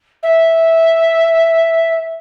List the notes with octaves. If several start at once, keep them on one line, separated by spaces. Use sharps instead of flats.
E5